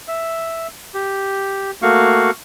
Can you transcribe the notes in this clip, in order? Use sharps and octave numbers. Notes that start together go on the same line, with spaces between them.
E5
G4
A3 A#3 F#4 F5 C#6